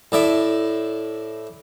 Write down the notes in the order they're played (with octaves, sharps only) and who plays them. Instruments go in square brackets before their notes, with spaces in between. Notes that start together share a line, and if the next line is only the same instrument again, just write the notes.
[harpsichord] A2 D5 E5